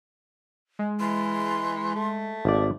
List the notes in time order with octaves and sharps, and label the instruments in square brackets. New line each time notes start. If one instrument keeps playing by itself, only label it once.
[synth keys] G#3
[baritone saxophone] E3 [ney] C6
[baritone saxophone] A3
[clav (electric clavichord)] G#1 D5